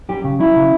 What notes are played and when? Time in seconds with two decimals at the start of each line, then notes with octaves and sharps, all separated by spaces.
0.09 F#2 G4
0.24 C#3
0.39 F#3 E4
0.56 C#3